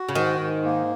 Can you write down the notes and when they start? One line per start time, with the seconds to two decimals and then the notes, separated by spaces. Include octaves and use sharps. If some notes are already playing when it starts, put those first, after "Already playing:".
Already playing: F#4
0.09 C#3
0.15 G#2 D#3
0.40 G#2
0.64 A#3